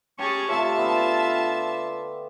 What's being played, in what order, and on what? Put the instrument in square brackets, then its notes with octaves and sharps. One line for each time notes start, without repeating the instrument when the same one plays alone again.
[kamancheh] C#4 G#4 [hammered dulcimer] G4 [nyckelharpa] A5 C#6
[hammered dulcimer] C3 A3 C#5 [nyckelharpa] F4 [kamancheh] E5 A5
[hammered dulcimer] D3 B3